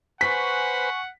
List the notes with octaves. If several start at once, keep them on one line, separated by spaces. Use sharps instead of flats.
B4 C5 F#5 G#5 C#6 B6